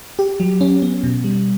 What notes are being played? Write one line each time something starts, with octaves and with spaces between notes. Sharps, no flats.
G4
F#3
C#4
B3
B2
G3